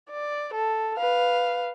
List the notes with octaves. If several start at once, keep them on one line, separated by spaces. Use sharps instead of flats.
D5
A4
B4 F5